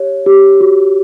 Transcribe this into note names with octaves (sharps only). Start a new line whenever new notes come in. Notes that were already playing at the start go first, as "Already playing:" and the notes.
Already playing: G4 C#5
G4
F#4